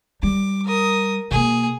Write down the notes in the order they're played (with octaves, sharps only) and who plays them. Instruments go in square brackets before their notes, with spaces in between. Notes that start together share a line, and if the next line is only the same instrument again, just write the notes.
[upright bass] G3 [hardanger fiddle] D6
[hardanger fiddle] A#4 D#6
[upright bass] B2 A#3 [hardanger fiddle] G#4